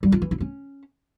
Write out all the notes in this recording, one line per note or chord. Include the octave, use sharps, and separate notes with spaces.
G3
F4
E3
E4
C#4